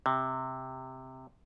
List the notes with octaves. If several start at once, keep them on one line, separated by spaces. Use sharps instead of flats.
C3